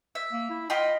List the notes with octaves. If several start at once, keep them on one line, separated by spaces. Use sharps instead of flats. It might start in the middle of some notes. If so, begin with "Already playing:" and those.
E5
A#3
E4
F4 D#5 G5 B5